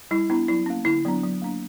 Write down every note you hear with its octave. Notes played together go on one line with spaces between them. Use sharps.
G3 E4
B3 D4 E4
F#3 E4
A#3 C#4
D3 E4
F#3 B3 D4
F#3
A#3 D4